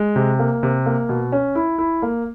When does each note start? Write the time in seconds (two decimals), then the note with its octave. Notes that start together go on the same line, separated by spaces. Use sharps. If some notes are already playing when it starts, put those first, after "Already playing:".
Already playing: G#3
0.16 C3
0.39 A#3
0.63 C3
0.86 A#3
1.09 B2
1.32 C#4
1.55 E4
1.78 E4
2.02 A#3